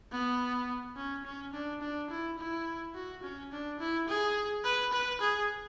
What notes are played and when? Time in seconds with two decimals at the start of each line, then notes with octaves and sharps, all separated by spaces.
0.12 B3
0.96 C#4
1.25 C#4
1.53 D4
1.81 D4
2.10 E4
2.38 E4
2.95 F#4
3.23 C#4
3.52 D4
3.80 E4
4.08 G#4
4.64 B4
4.93 B4
5.21 G#4